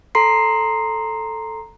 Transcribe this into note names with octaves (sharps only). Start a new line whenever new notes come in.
A4 A#5 C6 C7